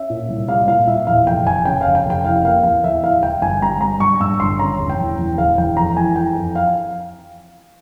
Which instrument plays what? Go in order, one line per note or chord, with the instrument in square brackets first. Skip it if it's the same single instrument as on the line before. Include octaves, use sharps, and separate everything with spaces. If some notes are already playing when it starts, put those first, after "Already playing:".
Already playing: [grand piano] C#4 E5
A#2
C2
G3 F5
A#2 F5
A#2 E5
E2 F5
F1 G5
F1 G#5
C#3 G5
F1 F5
G5
F1
G5
E3 F5
A#3 F5
E2 F5
E2 E5
E3 F5
E1 G5
G1 G#5
G3 A#5
G3 A#5
G2 C#6
G2 E6
G1 C6
C#3 A#5
E1
G5
E2
E2
E1 F5
E2 G5
F2 A#5
E3 G#5
E3 G5
F2
F5